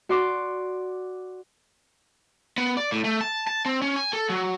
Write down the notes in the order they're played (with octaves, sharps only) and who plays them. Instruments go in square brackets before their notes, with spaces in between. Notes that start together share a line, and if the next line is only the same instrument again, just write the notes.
[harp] F#4 D5 C6 D6
[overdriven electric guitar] B3
D5
A2
A3
A5
A5
C4
C#4
G#5
A4
F#3